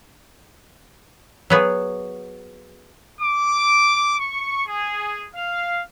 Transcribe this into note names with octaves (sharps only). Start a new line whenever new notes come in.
F#3 B3 G#4
D6
C#6
G#4
F5